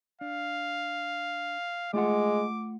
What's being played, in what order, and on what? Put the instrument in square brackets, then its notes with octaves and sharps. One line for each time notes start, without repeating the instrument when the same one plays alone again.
[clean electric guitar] D4 [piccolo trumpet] F5
[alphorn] G#3 [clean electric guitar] A3 F4 F#5 [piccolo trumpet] D6